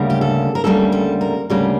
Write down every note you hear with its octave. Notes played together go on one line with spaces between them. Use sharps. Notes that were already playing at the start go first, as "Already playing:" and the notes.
Already playing: D2 C#3 G3 A#3
G4
A4
A#4
D2 C#3 G3 A#3 A4
A4
A#4
D2 C#3 G3 A#3 A4